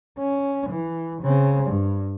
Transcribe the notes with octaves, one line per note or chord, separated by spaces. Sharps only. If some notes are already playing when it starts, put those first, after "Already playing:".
C#4
E3
C#3 C4
G2